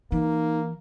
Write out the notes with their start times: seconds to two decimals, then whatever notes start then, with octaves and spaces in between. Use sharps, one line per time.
0.12 E3 A#3 D#4